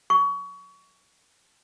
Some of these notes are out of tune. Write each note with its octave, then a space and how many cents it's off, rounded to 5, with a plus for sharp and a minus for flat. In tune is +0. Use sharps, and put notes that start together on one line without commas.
C#6 +25